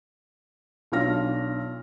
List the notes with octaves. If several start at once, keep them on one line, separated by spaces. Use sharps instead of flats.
B1 D4 F4 F6 A#6